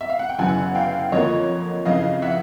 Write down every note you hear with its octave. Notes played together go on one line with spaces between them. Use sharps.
E5
F5
F#5
G5
G1 F#2 C#3 E3 F#5 G#5
F5 G5
F2 D3 F3 A#3 C#5 D#5
F2 C#3 E3 D#5 F5
E5 F#5